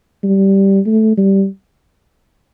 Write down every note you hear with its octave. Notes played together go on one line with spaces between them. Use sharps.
G3
A3
G3